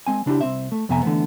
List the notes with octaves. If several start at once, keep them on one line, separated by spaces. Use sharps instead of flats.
G#3 C4 G#5
C#3 D4 E4 G4
C2 C4 E5
A3
F2 C3 B3 E5 G#5 A#5
D3 E3 F3 A3 B3